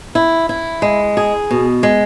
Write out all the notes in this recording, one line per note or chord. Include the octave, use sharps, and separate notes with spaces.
E4
E4
G#3
G#4
B2
G#3